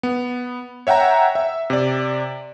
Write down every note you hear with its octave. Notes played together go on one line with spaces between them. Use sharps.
B3
C#5 E5 F#5 G5 A#5
E5
C3 D5